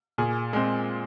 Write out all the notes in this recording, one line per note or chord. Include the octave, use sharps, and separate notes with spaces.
A#2 G#4
G#3 C4